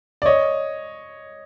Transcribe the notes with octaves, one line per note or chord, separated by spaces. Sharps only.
D5
C#5 D#5